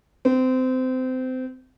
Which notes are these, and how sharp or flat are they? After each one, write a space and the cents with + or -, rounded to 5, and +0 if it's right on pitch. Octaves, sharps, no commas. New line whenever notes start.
C4 -25